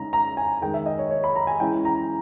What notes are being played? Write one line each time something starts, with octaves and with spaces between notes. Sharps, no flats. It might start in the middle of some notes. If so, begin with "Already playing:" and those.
Already playing: C#3 G#3 D#4 A#5
A#5
G#5
D#3 G#3 D#4 G5
E5
D#5
C#5
C#5
B5
A#5
G#5
E3 G#3 C#4 E4 G5
A#5